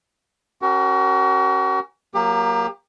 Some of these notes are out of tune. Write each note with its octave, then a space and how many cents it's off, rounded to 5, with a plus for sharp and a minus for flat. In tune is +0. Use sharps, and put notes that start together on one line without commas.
C#4 -25 F#4 +35 A#4 +0
F#3 -5 A#3 +0 G4 +35